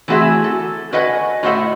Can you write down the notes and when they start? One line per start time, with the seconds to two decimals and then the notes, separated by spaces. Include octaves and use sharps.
0.08 E3 A3 C4 F#4 G#4 E5
0.44 A4
0.93 F#4 B4 D#5 F#5 G#5
1.43 A2 F#4 C5 D#5 E5 F#5